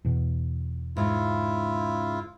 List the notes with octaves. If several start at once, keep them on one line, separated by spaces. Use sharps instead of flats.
E2 B2
G#2 C#3 E4 F4